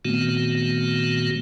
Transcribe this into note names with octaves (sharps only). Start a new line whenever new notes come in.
A#2 D#3 A3 B3 C4 F#4